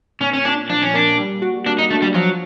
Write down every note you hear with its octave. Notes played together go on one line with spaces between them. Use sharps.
A#2 C#4
C#4
A#2 D4
F3 D4
C#4
A#3 D4
G3
F#4
A#3 D4
D#4
A3 D4
G3
F3 F#3